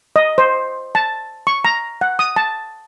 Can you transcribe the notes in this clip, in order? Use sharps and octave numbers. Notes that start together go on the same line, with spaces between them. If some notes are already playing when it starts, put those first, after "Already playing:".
D#5
C5
A5
C#6
A#5
F#5
D#6
A5